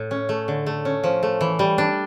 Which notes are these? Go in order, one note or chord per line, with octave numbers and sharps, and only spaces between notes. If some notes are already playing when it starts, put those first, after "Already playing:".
Already playing: A2
C#4
A3
D3
A3
C#4
F3
A3
E3
G3
D4